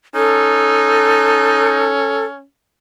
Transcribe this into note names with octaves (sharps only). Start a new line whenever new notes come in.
C#4 D#4 A4